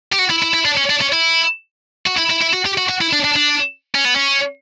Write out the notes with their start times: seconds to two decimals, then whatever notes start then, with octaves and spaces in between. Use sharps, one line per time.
0.13 G4
0.19 F#4
0.30 E4
0.43 E4
0.54 E4
0.65 D4
0.77 C#4
0.90 D4
1.01 C#4
1.12 E4
2.07 F#4
2.18 E4
2.31 E4
2.42 E4
2.54 F#4
2.66 G4
2.78 F#4
2.89 F#4
3.01 E4
3.13 D4
3.25 D4
3.36 D4
3.95 C#4
4.05 B3
4.16 C#4